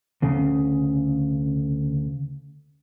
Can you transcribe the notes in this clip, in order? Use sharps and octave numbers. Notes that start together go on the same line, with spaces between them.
D2 C#3